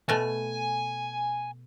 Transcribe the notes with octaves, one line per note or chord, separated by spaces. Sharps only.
B2 A3 G#5